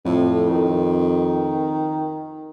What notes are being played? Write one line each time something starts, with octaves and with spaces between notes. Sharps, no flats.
F2 A2
D#3